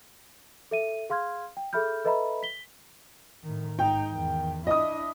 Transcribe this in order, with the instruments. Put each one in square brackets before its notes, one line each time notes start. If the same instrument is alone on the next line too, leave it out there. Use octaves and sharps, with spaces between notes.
[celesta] A4 E5 D#7
G#4 F5 C6 F6 G#6
G5
G#4 A4 E5 B5 F6 G6
A4 B4 D#5 E5 A#5 B5
B6 G7
[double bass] A2 D#3
[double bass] G#2 D#4 [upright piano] G5
[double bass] E2 D#3
[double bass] D4 E4 [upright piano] D#5 D#6